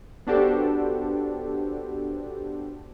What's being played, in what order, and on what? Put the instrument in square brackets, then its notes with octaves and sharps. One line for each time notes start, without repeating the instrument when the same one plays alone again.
[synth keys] B3 D4 F#4 G4 A4 C5